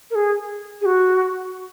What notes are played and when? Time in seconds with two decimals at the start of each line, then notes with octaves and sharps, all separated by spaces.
0.11 A#4
0.15 G#4
0.81 G#4
0.86 F#4